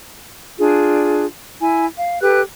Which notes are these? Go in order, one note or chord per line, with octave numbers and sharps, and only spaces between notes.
D4 F4 G#4
E4 G#5
F5
G4 A4 B4 F#6